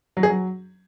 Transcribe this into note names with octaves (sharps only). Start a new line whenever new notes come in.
F#3
G#4
F#3